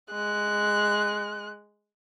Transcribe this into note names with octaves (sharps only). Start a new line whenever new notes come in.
G#3 F#6